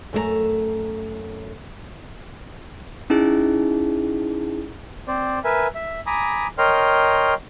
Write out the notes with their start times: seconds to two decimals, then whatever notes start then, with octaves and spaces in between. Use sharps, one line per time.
0.13 F#2 A3 A4 A#5
3.10 C#4 D#4 E4 G#4
5.08 C4 C5 D5
5.44 A#4 B4 E5 G#5
5.75 E5
6.07 G#5 A#5 B5 D6 D#6
6.58 A#4 C#5 D#5 G5 C6 F6